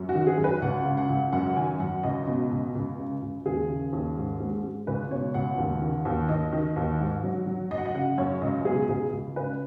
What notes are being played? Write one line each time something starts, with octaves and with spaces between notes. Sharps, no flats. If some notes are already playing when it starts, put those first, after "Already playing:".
Already playing: F#2
F#4
D#3
G#4
F#2
B4
C#2 F#5
C#3
F#5
C#2
F#2 F#5
D#3 G#5
F#2 F#5
C#2 D#5
B2
C#2
C#2
C#3
C#2
D#2 G#4
C#3
D#2
G#2
G#3
G#3
C#2 B4
B2 C#5
C#2 F#5
D#2
D#3
D#2
D#2 D#5
D#3
D#2
G#2
F#3
F#3
F#2 D#5
F#5
D#5
C#3 F#5
F#2 C#5
C#2 D#5
B2 G#4
C#2 G#4
C#2
C#3 B4